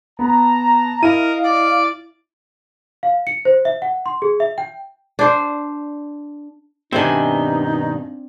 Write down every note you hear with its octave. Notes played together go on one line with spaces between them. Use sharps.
B3 A5 A#5
E4 A#4 D#5 F5 D#7
D5 D6
F5
C#7
C5
E5
F#5
C6
G#4
E5
G5
D4 C5
G2 B2 D#3 C4 D4 D#4 E5 G#5